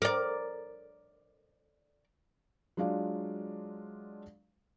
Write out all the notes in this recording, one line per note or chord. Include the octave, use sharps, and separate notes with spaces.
A#4 D5
F#3 G#3 D4 F4 D5 F5